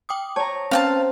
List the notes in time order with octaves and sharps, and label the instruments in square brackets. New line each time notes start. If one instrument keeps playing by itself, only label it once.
[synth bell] G5 D6 D#6
[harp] C#5 A#5 [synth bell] A5
[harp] C4 [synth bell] C#4 [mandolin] F5 G5 A5